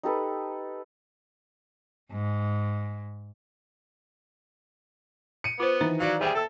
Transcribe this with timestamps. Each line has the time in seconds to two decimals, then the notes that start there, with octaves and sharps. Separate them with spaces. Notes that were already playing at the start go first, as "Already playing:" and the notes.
0.03 D#4 G4 A4 B4
2.11 G#2
5.44 C#7 D#7
5.60 B3 F4 C5
5.81 D#3 E3 B4 A#5
6.00 F#3 D5 F5
6.21 G3 G#4 C5 E5 G5
6.35 A4 A5 E6